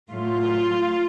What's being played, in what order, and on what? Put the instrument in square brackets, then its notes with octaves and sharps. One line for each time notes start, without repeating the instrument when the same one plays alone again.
[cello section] A2 F#3 A3 F4